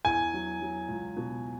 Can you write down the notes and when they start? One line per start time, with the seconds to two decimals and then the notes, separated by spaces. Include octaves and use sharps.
0.05 E2 G#5
0.33 F#3
0.61 F#3
0.88 C#2
1.16 B2